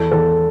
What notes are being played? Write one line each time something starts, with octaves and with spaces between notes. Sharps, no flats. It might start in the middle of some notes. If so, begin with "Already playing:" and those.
Already playing: E2 A4
E2 A4